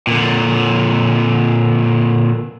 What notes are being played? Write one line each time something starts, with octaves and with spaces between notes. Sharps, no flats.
A#2 D3